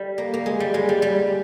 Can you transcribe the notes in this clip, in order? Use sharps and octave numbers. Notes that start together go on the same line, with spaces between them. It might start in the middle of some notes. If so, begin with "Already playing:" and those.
Already playing: G3
A#3
A#3
G#3
G3
G#3
G3
G3